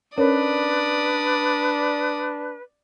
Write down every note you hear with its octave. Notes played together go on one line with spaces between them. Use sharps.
C#4 D4 A#4 B4 C#5 D5 D#6